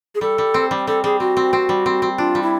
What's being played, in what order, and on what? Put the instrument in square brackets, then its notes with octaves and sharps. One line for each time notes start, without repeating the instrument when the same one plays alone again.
[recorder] G#4
[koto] G3 [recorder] A4
[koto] G3
C4
G3
[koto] G3 [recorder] A4
[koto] G3 [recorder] G#4
[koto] C4 [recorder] F#4
[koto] C4
C4
G3
C4
C4
[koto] D4 [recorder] F4
[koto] G3
[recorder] E4